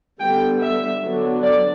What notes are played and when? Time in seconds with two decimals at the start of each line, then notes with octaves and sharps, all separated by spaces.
0.20 D3 G3 B3 G5
0.61 E5
1.02 D3 F#3 B3 D4
1.43 D5